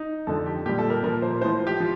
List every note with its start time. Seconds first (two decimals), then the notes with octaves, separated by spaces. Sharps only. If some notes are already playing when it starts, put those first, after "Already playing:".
Already playing: D#4
0.27 F2 D3 F3 A4
0.46 G4
0.65 A#2 G3 G4
0.78 A4
0.90 A#4
1.03 A#2 F3 A#4
1.22 C5
1.41 A2 F3 C5
1.67 G4
1.80 F3